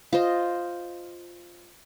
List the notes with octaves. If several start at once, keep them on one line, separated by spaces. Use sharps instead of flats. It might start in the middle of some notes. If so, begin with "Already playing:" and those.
F4 C5 D#5